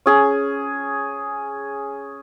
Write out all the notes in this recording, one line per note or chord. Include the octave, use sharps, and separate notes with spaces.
C#4 G#4